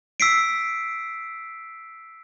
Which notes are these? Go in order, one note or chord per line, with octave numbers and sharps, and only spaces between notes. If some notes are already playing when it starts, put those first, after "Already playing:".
E6 B6 C7 D7